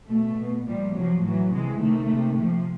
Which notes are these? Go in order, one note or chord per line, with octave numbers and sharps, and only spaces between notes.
B2 A3
B2
A#2 F3 G3
C3 F3 F#3
A2 E3 F#3
C3 E3 G#3
C3 D#3 A3
C3 D#3
C3 F3